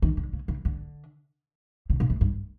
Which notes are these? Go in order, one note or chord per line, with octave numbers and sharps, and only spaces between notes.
D#3
D3
C#3
C#3
D3
C#3
A#2
A2
G2